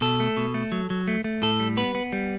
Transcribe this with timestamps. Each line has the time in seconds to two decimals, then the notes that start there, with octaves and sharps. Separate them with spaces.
0.01 B2 A4
0.20 A3
0.37 B2
0.54 A3
0.72 F#3
0.90 F#3
1.08 A3
1.24 A3
1.42 A2 A4
1.60 G3
1.77 B3 B4
1.95 B3
2.12 G3